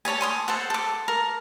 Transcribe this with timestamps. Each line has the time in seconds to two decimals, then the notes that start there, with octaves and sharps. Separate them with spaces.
0.05 A4 C#5 D5 G#5
0.21 G#5 C6 D#6
0.48 A4 C5 F#5
0.70 A4 D6
1.08 A#4